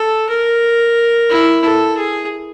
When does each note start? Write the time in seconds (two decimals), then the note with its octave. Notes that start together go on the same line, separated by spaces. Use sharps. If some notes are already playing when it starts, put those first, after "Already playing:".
Already playing: A4
0.29 A#4
1.29 E4
1.63 A4
1.97 G#4